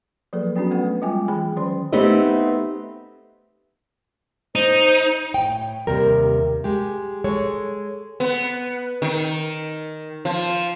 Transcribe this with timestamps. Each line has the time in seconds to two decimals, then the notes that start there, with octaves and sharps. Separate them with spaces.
0.33 F3 F#3 A#3 G#4 A4 B4
0.56 F#3 B3 C#4 D4 F#4
0.71 A3 A4 B4 F#5
1.02 G3 G#3 F4 G5 G#5 D6
1.28 E3 G#4 G5 B5
1.56 D#3 F#3 C#4 C5 C6
1.92 A3 B3 C4 D#4 G4 D#5
4.56 D#4 C5
5.34 A2 G5
5.87 D#2 C3 G3 A#4
6.64 G#3 G4
7.24 G#3 A4 C#5
8.20 B3
9.02 D#3
10.25 F3